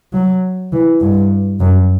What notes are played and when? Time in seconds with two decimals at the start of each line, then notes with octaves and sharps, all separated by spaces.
0.13 F#3
0.72 E3
1.00 G2
1.60 F#2